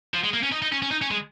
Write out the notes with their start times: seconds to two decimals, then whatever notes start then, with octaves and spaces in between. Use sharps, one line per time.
0.14 F3
0.24 G#3
0.34 A#3
0.43 C#4
0.52 D#4
0.62 D#4
0.72 C#4
0.82 C#4
0.91 D#4
1.02 C#4
1.11 G#3